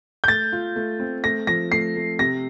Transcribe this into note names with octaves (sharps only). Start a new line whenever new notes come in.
G6
A3 A6
F4
A3
C4
A3 A#6
F3 A#6
A3 C7
A3
C3 A#6